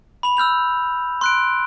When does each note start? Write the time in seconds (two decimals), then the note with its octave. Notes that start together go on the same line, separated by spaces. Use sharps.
0.23 B5 F7
0.37 E6 F6 G6 F7
1.21 C6 F#6 D7